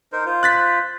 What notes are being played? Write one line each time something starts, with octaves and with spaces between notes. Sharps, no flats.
D#4 A#4 C5
F4 C5
F#6 A6 B6